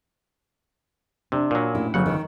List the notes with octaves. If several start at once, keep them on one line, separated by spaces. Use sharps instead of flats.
C3 D4
A#2 F#3
A2 C#4 E4
G1 C#3 F#3 F#5
D#3